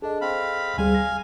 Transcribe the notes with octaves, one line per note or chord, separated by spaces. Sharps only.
D4 G#4 A4 D#5
C4 F5 B5
D2 G3 G#4 F5 G#5
A#6